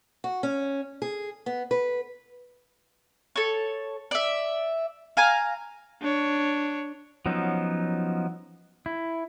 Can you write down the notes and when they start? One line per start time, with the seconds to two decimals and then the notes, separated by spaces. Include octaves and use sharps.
0.24 F#4
0.43 C#4
1.02 G#4
1.46 B3
1.71 B4
3.36 A4 C#5
4.11 D5 E5
5.17 F5 G#5 A#5
6.01 D4 C#5
7.26 F3 F#3 B3 C#4 D#4
8.86 E4